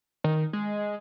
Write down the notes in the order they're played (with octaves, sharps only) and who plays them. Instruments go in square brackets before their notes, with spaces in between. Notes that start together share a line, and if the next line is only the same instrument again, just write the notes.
[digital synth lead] D#3
G#3